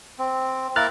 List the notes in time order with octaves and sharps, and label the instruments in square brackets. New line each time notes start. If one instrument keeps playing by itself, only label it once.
[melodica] C4
[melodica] A#3 E4 A#4 [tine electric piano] F6 F#6 A6